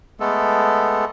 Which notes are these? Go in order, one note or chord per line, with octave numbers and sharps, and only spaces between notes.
G#3 A3 B3 A4